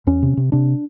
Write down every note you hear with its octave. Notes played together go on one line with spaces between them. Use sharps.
E2 C#4
C3
C3
C3 D4